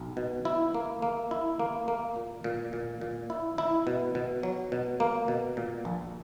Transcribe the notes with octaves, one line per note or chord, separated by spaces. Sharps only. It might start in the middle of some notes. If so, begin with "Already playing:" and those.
Already playing: B1
B2
E4
A#3
A#3
E4
A#3
A#3
A#2
A#2
A#2
A#2
E4
E4
B2
B2
F#3
B2
A#3
B2
A#2
A#1